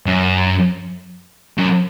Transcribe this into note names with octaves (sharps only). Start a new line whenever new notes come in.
F#2
F#2